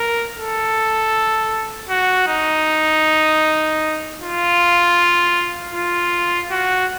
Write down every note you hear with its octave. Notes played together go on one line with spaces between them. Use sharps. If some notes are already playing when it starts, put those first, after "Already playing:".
Already playing: A#4
A4
F#4
D#4
F4
F4
F#4